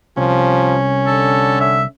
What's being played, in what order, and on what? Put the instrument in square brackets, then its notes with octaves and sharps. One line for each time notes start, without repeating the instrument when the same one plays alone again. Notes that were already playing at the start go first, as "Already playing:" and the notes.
[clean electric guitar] C2 [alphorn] F3 [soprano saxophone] C#4
[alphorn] D3 [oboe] A4
[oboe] E5